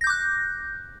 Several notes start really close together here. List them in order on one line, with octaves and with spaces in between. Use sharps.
A#6 G6 D6 F#6